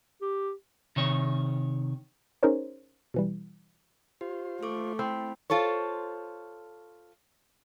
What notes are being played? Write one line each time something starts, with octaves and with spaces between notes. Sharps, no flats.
G4
C3 D#3 C#5
C#4 D#4 G#4 A#4 C5 C#5
B2 E3 G3
F4 G4 C5
A3 A4 C#6 D6
C4 E4 B5
F4 A4 C5 C#5